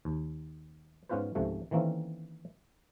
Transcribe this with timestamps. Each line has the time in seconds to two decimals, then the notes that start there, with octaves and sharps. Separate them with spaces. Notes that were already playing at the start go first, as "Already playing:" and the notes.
0.05 D#2
1.09 G#2 B3 C#4 F4 B4 C5
1.35 C#2 G#2 C3 F3 A3
1.71 D#3 E3 A3 A#3 C4 C#4